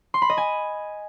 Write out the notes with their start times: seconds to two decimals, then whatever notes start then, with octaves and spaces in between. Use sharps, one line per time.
0.14 C6
0.22 B5
0.30 D#5
0.37 G#5